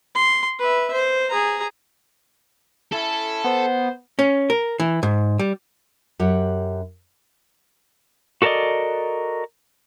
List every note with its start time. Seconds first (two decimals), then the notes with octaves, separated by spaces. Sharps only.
0.15 C6
0.59 B4 E5
0.93 C5
1.29 G#4 A#5
2.92 C#4 E4 A4
3.44 B3 C5
4.19 C#4
4.50 A#4
4.80 E3
5.03 G#2
5.39 G3
6.19 F#2 G4 C#5 F#5
8.42 F#4 A4 A#4 C5 D5 D#5